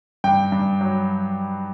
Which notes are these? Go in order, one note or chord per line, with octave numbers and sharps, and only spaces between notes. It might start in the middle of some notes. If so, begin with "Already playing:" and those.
G2 G5
G2
F#3